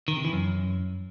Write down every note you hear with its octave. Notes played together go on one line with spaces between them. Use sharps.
D#3
C3
E3
F#2